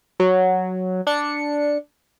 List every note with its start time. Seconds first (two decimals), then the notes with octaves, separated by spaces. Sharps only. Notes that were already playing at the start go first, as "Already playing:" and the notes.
0.20 F#3
1.07 D4 C#7